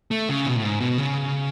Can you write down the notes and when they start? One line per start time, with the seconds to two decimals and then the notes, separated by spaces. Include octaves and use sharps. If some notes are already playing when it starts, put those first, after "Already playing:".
0.11 A3
0.29 C#3
0.46 B2
0.56 A2
0.63 G#2
0.80 B2
0.98 C#3